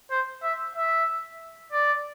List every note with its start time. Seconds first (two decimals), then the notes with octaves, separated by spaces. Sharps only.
0.11 C5
0.43 E5
0.75 E5
1.72 D5